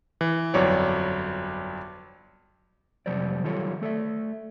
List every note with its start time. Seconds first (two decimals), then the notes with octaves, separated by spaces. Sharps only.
0.21 E3
0.54 G1 F2 F#3 C#5 D5
3.06 F2 C3 F#3 G3 C5 D5
3.44 D#3 F#3 G3 F4 A4 C#5
3.81 A3 A4 D5 E5